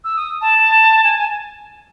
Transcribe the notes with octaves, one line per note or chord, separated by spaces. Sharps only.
E6
D#6
A5
G#5
G#5